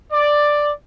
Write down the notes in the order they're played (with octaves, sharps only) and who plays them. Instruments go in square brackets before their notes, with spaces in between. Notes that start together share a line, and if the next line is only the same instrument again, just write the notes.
[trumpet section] D5